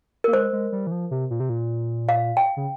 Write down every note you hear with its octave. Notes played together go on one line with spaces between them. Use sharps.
A#3 A#4
G#3 C5
G#3
G3
E3
F3
C3
A#2
C3
A#2
F5
G5
C#3